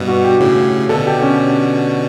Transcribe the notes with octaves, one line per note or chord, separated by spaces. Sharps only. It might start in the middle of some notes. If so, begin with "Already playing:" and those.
Already playing: G2 B2
F#4
G4
A2 C#3
B2 D3 A4
G4
C#4